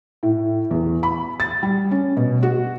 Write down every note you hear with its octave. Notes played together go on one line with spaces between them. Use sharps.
A2
E2
B5
A6
G3
C#4
B2
F#4